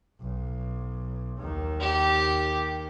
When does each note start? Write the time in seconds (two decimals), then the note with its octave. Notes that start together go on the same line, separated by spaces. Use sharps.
0.21 B1
1.39 D#2 D#3
1.80 G4